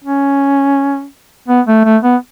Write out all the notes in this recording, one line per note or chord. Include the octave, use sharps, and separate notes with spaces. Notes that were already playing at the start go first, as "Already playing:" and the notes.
C#4
B3
A3
A3
B3